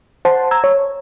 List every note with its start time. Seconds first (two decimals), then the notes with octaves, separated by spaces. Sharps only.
0.25 C5 F#5 A5 C6
0.51 A#5 E6 G#6
0.64 C#5